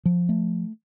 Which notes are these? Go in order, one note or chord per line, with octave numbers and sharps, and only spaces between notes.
F3
A3